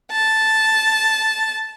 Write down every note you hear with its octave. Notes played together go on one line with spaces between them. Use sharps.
A5